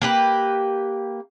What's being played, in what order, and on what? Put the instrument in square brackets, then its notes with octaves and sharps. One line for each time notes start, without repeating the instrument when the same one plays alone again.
[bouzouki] A#3 G4 B4